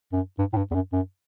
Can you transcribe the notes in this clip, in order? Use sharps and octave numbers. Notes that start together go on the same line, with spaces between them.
F#2
G2
A2
G2
E2
F#2
F#2